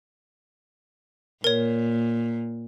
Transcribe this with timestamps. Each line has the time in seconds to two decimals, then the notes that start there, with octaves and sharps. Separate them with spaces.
1.44 A#2 A#4 C#5